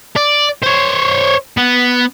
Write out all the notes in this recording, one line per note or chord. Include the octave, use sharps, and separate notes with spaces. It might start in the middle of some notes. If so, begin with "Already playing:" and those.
D5
C5 C#5
B3